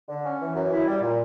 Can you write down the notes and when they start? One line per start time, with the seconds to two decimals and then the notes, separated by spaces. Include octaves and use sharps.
0.09 D3
0.24 C#4
0.40 E3
0.55 F#2
0.71 E4
0.87 G3
1.02 A#2